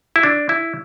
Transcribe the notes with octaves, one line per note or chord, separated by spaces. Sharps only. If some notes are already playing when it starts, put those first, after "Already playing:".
E4
D4
E4